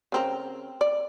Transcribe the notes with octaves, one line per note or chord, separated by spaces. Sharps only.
C#3 C4 A#4
D5